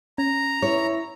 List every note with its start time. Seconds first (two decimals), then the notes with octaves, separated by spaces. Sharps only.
0.18 C#4 A#5
0.62 E4 C#5